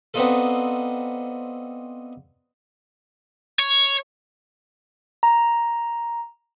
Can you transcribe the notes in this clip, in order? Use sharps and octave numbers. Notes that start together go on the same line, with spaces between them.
B3 C4 D4 D#4 F4 A4
C#5
A#5